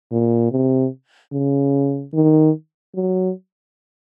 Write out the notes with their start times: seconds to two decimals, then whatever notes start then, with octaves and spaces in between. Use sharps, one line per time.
0.12 A#2
0.51 C3
1.33 C#3
2.14 D#3
2.95 F#3